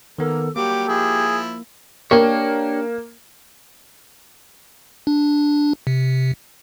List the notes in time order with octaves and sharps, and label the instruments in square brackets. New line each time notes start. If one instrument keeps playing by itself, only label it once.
[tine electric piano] D#3 B3 A#4 [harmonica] A#3 [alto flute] A4
[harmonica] F#3 G3 D6 [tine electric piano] A#3 [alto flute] G4
[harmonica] F3 E4 [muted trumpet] G#4
[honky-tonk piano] A#3 [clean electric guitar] D4 G4 C#5
[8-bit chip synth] D4
C3